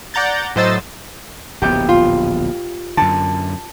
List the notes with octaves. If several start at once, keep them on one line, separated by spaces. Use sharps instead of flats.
D5 F#5 A#5 G6 A6
A2 F#3 C5 D#5 E6 A6
D1 A#1 B3 G4 G5
F4
F#2 D3 A5